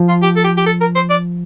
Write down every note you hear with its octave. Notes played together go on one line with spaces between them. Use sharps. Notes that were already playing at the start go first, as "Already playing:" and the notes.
Already playing: F3
F4
G4
A4
G4
G4
A4
A#4
C5
D5